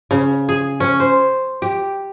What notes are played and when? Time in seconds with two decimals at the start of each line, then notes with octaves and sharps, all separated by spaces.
0.11 C#3
0.49 G#4
0.80 C#4
1.00 C5
1.62 G4